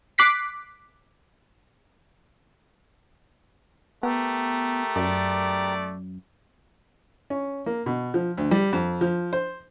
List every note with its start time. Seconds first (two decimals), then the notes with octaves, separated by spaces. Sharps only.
0.18 D6 F#6 B6 C7
4.03 A3 B3 G4 A#4
4.96 F#2 D5
7.30 C#4
7.66 A#3
7.86 B2
8.14 F3
8.38 D2
8.51 G3
8.73 F2
9.01 F3
9.33 C5